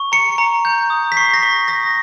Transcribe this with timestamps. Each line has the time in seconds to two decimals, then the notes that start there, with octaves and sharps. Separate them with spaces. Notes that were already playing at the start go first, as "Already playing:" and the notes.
Already playing: C#6
0.12 A#5 C#7
0.38 A#5
0.65 G6
0.90 D#6
1.12 B6
1.17 C#6 C7
1.34 A#6
1.43 C#6 B6
1.68 D#6 A#6